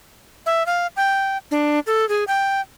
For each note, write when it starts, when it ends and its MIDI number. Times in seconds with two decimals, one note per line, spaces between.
0.46 0.66 76
0.66 0.87 77
0.96 1.37 79
1.51 1.79 62
1.87 2.07 69
2.09 2.24 68
2.27 2.61 79